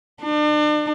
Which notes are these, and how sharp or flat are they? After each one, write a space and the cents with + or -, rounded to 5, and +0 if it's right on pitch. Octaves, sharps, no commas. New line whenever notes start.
D4 +40